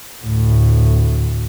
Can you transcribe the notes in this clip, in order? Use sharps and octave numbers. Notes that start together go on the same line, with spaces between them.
D2 A2